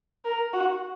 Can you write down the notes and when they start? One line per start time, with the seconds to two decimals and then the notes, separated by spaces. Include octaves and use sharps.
0.25 A#4
0.53 F#4